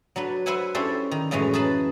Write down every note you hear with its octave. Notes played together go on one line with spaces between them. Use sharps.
F#3 D4 B4
B4 C5 E5 F#5 G#5
C#4 D4 E4 G4 A4 C5
D#3
F#2 A2 E3 G#3 C#4
G#4 A#4 B4 A5 B5